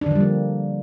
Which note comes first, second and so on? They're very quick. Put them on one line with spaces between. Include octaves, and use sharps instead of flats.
D4 D3 F3 G3 A#3